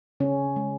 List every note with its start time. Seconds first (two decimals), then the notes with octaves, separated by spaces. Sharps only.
0.20 C#3 C#4
0.56 G#3